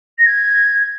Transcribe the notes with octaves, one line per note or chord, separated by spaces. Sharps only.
A#6
G#6